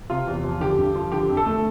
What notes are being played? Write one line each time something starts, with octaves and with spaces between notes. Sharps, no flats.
C3 F4
E2
F3
D3 G4
G2
F3
D3 G4
F2
A4
A3